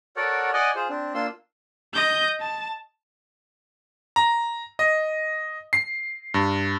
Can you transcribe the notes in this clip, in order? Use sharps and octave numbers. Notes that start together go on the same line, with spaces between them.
F#4 A4 A#4 C#5 D5 F#5
D5 D#5 F#5 G#5
F4 G#4 C5
C4 D4
A#3 D4 F4 C6 E6
D#5 G6
A5
A#5
D#5
C7
G2